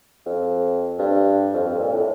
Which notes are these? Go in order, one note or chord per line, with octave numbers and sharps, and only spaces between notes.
F2
G2
F2
F2
A#2
A2